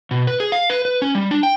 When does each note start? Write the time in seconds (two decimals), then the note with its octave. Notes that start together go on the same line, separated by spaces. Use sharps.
0.11 B2
0.27 B4
0.40 G#4
0.52 F5
0.70 B4
0.85 B4
1.02 C#4
1.15 G3
1.31 D4
1.43 G5